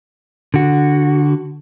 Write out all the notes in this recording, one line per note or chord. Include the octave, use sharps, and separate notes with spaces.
D3 F#4